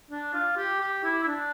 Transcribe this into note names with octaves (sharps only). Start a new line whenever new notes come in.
D4
F4
G4
G4
E4
E4
D4